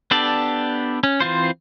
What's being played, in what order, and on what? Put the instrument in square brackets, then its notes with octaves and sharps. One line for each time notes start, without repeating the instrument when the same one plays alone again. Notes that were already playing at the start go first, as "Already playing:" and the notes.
[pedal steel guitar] B3 D4 G4 A4 D5
C#4
E3 C4 F4 C5